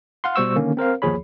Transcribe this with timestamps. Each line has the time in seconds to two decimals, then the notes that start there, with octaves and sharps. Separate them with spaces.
0.24 F5 F#5 C6
0.36 B2 G3 C5 C#6 E6
0.56 D3 D#3 A#3 C#4
0.77 C4 A#4 C5 F5
1.02 G1 D#2 F3 G#4 C#5 B5